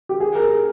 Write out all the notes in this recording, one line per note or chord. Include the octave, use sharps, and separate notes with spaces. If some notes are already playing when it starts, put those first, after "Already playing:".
G4
G#4
A#4